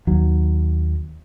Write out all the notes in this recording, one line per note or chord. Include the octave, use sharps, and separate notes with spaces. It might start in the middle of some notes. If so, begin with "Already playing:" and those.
D#2 F#3